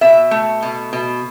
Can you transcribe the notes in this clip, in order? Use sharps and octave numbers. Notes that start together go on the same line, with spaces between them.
B2 E5
A3
B2
B2